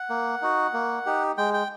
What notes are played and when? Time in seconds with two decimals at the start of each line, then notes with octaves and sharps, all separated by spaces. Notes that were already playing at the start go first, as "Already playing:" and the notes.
Already playing: F#5
0.10 A#3
0.42 D#4 F#4
0.73 A#3
1.06 D#4 G4
1.38 G#3 G5
1.54 G5